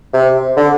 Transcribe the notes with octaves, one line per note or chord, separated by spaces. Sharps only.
C3
D3